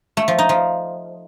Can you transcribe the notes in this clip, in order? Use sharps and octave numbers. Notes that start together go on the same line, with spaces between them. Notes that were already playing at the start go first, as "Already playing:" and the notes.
A3
F3
D#4
F3